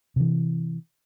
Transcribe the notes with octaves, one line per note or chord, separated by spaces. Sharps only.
C3 E3